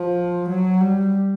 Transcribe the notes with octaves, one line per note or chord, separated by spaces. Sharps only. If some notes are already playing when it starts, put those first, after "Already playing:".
Already playing: F3
F#3
G3